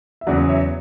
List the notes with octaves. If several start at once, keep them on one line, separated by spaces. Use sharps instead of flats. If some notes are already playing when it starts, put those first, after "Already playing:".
E5
E2 C#3 F#3 D5 F#5
C#5 E5